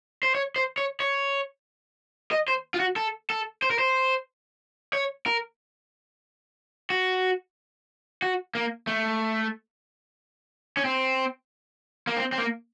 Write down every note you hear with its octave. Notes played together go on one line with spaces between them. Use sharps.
C5
C#5
C5
C#5
C#5
D#5
C5
F4
F#4
A4
A4
C5
A#4
C5
C#5
A#4
F#4
F#4
A#3
A3
C#4
C4
A#3
C4
C4
A#3